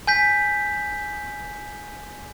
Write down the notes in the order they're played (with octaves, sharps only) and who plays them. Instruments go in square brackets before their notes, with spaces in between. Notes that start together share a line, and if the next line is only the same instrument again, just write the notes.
[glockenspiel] G#5 G6 B6